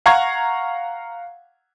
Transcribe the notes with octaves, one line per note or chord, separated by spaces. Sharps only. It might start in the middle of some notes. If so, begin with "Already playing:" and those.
F5 F#5 A#5 C#6 G#6